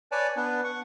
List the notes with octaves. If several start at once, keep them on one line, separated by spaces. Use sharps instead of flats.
B4 C#5 D5 G#5 A5
B3 D4 B4
F#5 C#6